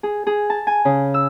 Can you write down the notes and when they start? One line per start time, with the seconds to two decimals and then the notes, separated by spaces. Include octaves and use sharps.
0.03 G#4
0.27 G#4
0.50 A5
0.67 G#5
0.85 C#3
1.14 E6